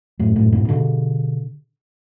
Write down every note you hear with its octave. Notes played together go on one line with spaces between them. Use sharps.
F#2 A2
F#2 A2
G#2 B2
B2 D3